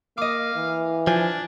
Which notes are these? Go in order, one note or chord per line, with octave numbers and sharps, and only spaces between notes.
A#3 D#5 F5 D6
E3
F3 D4 G#5